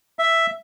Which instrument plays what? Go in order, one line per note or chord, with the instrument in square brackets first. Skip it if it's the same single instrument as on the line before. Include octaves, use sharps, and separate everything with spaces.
[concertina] E5